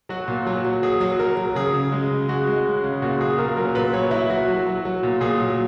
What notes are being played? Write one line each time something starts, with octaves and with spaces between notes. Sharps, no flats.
F#3 F#4
A#2
F#3
F#3
F#3 G#4
F#3
F#3 A#4
F#3
C#3 G#4
C#3
G#3
C#3
G#3 F#4
G#3
C#3
C#3
A#2 F#4
F#3 G#4
A#2 A#4
F#3 A#4
A#2 B4
F#3 C#5
F#3 E4
F#3 F#4
F#3
F#3
F#3
A#2
A#2 G#4
F#3